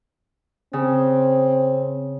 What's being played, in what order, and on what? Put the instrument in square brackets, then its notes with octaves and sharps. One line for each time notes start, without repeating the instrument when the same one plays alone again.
[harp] C#3 [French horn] C4